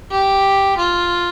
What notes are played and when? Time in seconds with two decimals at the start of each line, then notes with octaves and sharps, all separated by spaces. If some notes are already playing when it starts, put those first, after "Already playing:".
0.11 G4
0.77 F4